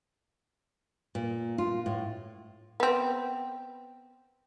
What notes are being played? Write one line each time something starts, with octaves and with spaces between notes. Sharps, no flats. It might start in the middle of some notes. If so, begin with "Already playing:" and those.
A#2
F4
A2
B3 C4